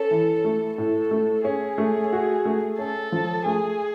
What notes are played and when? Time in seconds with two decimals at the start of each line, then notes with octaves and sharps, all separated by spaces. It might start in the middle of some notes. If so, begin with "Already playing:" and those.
Already playing: C#4 A4
0.11 E3
0.44 A3
0.78 A2 A4
1.11 A3
1.45 C#4 G#4
1.78 A3
2.13 F#4
2.45 A3
2.79 C#4 A4
3.12 F3
3.46 A3 G#4